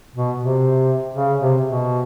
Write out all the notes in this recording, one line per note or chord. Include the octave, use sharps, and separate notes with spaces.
B2
C3
C#3
C3
B2